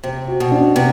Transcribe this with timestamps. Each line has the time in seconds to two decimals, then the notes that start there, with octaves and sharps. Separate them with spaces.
0.03 C3 C5
0.28 F#4
0.40 B2
0.52 D4
0.76 C3 B3